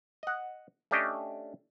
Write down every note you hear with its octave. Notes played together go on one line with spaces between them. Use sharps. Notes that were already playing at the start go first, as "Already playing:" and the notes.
D#5 F#5
A3 C#4 D4 G4 D#5 G5